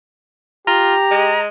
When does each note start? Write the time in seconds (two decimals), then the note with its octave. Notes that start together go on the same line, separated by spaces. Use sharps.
0.67 F4 G4 A#5
1.11 G#3